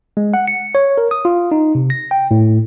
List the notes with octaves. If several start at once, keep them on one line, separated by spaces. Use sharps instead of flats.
G#3
F#5
C#7
C#5
A#4
D#6
F4
D#4
C3
A#6
G5
A2